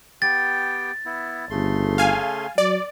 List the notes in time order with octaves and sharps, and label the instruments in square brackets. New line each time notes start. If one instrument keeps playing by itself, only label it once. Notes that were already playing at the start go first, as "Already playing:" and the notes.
[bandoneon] B3 G4 G5 [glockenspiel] A6
[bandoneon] B3 E4
[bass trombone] G1 [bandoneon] C#3 A3 C6
[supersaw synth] F5 G#5
[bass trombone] F#3 [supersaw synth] D5